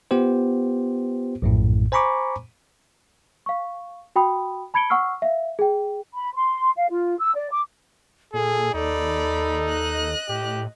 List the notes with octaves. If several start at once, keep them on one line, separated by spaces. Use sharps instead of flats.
B3 F4 G4 C5
A#1 F#2 A2
C5 G#5 A#5 B5 C#6 D6
F5 C#6
F#4 G5 B5 D#6
A5 B5 G#6 C#7 D7 G7
F#5 C#6 E6 F6 C7
E5 F5
G#4 G5
B5
C6
F5
F4
E6
D5
D6
A#2 G#4 A4
D#2 D#4 A4 D5 B5
D#5 F#6
A2 G4